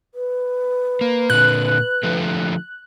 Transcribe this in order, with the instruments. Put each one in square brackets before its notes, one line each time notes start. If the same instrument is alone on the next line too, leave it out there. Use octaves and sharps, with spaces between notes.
[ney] B4
[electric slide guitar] A#3
[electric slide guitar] A#2 D3 [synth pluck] F#6
[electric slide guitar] D3 F3 A3